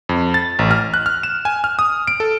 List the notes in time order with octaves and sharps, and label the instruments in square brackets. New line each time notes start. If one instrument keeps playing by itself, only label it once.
[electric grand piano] F2
A6
A1
F6
F#6
F6
E7
G#5
F6
D#6
D7
A4